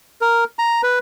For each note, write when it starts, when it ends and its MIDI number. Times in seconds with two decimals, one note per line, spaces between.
0.21 0.44 70
0.59 0.82 82
0.83 0.99 71